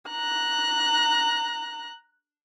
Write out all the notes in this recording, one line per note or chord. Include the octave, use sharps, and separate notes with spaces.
A#5 F#6